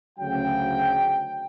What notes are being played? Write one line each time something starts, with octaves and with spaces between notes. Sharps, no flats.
D2 C#3 F#3 G5